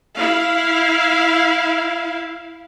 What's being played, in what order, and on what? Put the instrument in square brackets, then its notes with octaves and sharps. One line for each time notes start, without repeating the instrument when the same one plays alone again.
[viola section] E4 F5